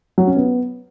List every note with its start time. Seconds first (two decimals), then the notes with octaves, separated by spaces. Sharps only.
0.18 F#3
0.27 C#4
0.37 B3